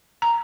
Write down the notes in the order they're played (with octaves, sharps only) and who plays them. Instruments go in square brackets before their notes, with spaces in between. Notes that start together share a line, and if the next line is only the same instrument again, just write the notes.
[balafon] A#5